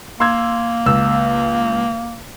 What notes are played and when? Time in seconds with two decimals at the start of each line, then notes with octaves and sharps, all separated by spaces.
0.20 A#3 C6 E6 G#6
0.86 C#2 E6